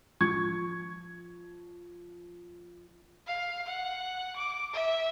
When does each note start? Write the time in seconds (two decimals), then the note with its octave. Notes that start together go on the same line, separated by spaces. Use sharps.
0.21 F3 C#6 G#6
3.27 F5
3.66 F#5
4.36 D6
4.73 E5